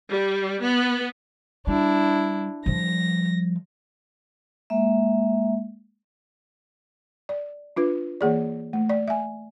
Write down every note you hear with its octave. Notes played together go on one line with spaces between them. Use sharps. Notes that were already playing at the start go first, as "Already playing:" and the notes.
G3
B3
G3 D4 E4
F3 G3 A#6
G#3 A#3 E5
D5
D4 F4 B4
E3 A#3 G#4 D5
A3
D5
E5 G#5